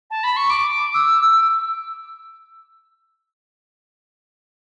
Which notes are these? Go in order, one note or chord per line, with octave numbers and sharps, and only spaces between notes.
A5
B5
C#6
D6
E6